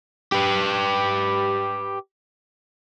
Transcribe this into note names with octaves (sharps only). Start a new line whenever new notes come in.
G4 B4